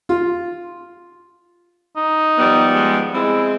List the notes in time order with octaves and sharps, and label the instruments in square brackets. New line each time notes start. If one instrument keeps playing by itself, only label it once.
[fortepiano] F4
[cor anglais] D#4
[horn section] F3 G3 B3
[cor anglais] G#3
[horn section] G#3 C4 [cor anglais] E4